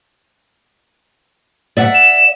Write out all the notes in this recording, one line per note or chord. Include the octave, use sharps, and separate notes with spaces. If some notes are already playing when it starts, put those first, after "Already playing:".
D5 E5 F#5
E7